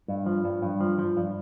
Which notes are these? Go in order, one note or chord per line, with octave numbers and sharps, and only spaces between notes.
G2
F3
G2
G2
F3
F3
G2